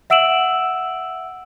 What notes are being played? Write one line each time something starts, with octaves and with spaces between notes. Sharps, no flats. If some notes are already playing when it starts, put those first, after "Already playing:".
E5 F#5 E6 D7 E7 F#7